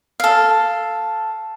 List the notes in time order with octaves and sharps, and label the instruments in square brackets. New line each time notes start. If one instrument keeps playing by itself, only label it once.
[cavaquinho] A4 F5